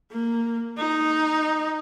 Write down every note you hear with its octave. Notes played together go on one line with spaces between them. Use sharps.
A#3
D#4